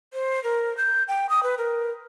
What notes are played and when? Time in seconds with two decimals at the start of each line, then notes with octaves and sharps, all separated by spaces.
0.13 C5
0.44 A#4
0.77 G6
1.08 G5
1.29 D#6
1.43 B4
1.58 A#4